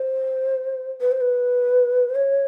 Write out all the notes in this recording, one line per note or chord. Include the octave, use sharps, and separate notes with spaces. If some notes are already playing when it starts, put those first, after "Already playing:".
Already playing: C5
B4
C5
B4
C5
C#5